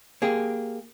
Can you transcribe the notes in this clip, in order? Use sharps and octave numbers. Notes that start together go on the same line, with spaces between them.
A#3 G4 G#4